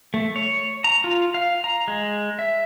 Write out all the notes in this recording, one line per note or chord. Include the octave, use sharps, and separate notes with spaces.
A3
C#5
A#5
F4
F5
A#5
G#3
E5